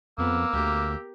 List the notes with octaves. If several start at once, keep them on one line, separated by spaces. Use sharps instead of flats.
F2 A#3 B3 E6
D2 G4 A#4